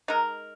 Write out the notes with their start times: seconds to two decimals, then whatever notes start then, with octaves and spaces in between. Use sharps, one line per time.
0.08 G#3 D#4 A#4